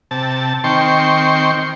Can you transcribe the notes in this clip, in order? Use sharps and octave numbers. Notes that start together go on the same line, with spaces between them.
C3 A5
D#3 C4 G5 C6 C#6